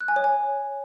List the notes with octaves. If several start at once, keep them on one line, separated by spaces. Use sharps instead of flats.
F#6
G#5
C#5
G#5